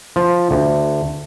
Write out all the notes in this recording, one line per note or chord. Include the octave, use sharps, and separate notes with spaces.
F3
D2